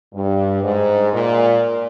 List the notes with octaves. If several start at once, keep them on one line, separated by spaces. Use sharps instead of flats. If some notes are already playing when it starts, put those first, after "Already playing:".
G2
G#2
A#2